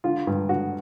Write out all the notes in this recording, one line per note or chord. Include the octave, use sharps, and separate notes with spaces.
D3 F4
G2
D3 F#4